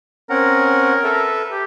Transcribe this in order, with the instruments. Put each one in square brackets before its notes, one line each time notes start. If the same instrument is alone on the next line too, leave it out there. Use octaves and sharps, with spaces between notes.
[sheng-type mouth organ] C4 C#4 F#5 [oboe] A#4
[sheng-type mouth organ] A4 B4 E5
[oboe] G4